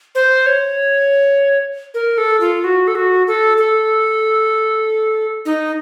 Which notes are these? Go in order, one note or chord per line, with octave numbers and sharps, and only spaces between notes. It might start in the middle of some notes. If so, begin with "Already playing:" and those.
C5
C#5
A#4
A4
F4
F#4
A4
F#4
A4
A4
D#4